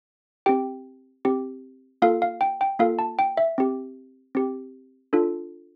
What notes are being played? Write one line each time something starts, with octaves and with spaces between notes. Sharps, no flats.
C4 G4 G5
C4 G4
A#3 F4 A4 F5
F5
G5
G5
A#3 F4 A4 F5
A5
G5
E5
C4 G4
C4 G4
D4 F4 A4